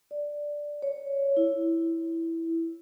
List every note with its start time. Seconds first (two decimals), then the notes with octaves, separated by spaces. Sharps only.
0.11 D5
0.82 C#5
1.37 E4